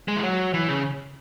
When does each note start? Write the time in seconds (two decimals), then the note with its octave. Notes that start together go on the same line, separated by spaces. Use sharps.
0.08 G#3
0.16 E3
0.23 F#3
0.54 E3
0.69 C#3